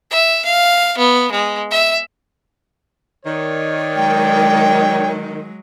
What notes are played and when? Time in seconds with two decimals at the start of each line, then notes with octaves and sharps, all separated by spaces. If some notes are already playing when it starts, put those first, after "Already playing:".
0.10 E5
0.45 F5
0.98 B3
1.31 G#3
1.71 E5
3.25 D#3 C#5 D5
3.96 F#3 G#3 G5